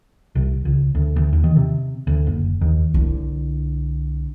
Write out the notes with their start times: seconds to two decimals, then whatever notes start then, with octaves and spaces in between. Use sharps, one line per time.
0.35 C2
0.65 C#2
0.95 D2
1.16 D2
1.33 D#2
1.44 D#3
1.56 C3
2.07 D2
2.27 F#1
2.61 D#2
2.94 C2 D3